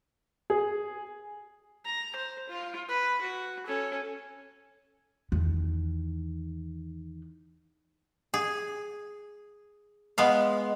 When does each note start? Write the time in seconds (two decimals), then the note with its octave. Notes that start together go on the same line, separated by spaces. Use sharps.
0.50 G#4
1.85 A#5
2.16 C5
2.49 F4
2.89 B4
3.22 F#4
3.66 C#4 A4
5.32 E2 D#3
8.34 G#4
10.18 G#3 B3 F5